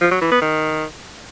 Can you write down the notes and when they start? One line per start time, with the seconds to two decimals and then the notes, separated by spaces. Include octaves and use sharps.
0.01 F3
0.11 F#3
0.21 E3
0.32 B3
0.42 D#3